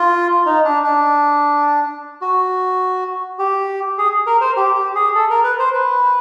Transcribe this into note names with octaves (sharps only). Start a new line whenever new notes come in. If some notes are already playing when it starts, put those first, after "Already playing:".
Already playing: F4
D#4
D4
D4
F#4
G4
G#4
A#4
C5
G4
G4
G#4
A4
A#4
B4
C5
B4